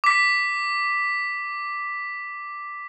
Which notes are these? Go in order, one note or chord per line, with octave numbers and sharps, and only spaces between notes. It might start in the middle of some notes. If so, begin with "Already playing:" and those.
D6 B6